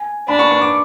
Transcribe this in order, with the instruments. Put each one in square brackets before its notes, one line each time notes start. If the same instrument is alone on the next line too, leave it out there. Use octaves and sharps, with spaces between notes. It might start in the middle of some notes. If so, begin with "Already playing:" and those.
Already playing: [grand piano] G#5
[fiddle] D4 [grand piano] B5
[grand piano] C#6
C#6
D6